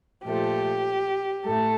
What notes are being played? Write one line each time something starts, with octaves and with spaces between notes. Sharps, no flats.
A#2 F3 A3 G4
A2 A3 A4